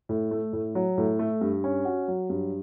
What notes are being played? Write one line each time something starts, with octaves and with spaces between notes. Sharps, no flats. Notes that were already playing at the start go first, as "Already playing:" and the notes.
A2
A3
A2
F#3
A2
A3
G2
C#4
F#4
F#3
G2